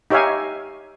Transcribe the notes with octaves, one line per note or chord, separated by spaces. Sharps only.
D#4 G4 C#5 E5 F5 G#5